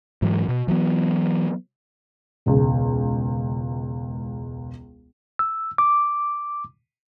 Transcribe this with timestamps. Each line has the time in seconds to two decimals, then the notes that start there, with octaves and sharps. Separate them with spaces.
0.22 G#2 E3 F#3
0.48 B2
0.68 E3 F#3 B3
2.46 E1 C#2
5.39 E6
5.78 D6